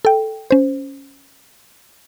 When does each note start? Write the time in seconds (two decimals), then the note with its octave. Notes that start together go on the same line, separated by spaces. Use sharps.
0.05 A4 G5
0.51 C#4 C5